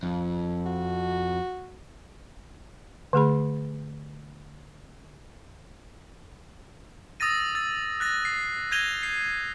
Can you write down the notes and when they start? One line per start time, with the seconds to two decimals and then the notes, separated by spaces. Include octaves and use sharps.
0.03 F2
0.66 F#4
3.13 D3 A3 G#4 B5
7.20 D#6 E6 A6 A#6 D#7
7.55 E6 A6
8.00 F#6 A6 A#6
8.25 C7
8.71 G6 G#6 A#6 D#7 F7 G7
9.03 C7